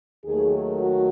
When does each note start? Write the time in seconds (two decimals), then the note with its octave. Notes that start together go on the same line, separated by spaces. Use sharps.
0.25 D#2 D#3 F#3 A3 G#4
0.80 F#4